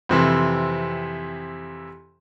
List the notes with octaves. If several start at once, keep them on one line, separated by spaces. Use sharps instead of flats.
F2 C3 E3